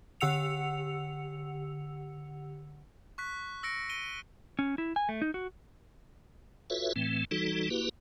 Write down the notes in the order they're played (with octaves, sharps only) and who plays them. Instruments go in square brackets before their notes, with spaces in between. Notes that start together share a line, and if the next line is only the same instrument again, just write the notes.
[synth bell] D3 G4 F#5 E6 C#7 F7
[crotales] C#6 F#6 B6
E6 A#6 C#7 D7
D7 D#7 G7
[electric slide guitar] C#4
E4
G#5
A3
D#4
F#4
[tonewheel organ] F4 F#4 A4 B4 C#5 E5
A2 E3 A3 C4
E3 G3 D#4 F#4 A4
A#3 E4 F#4 G4 B4